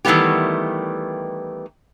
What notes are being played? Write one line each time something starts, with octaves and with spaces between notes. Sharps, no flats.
D#3 E3 G3 A3 B3 G4